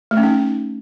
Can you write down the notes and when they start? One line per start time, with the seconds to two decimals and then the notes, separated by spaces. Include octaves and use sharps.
0.11 A3
0.17 C#4
0.23 D#4